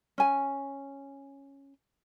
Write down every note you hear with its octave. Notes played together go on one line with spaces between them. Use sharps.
C#4 G#5